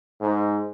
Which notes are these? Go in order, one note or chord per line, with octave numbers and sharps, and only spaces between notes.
G#2